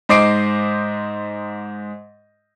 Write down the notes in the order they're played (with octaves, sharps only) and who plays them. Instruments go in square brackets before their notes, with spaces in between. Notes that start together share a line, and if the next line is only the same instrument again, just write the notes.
[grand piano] G#2 C5 D#5 D6 C7 D7